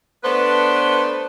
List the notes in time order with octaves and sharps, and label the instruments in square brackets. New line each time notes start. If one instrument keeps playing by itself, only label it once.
[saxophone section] A3 B3 D4 B4 C5